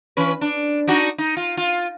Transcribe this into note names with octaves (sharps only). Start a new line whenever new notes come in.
E3 C#4 B4
D4
D4 D#4 F#4
D#4
F4
F4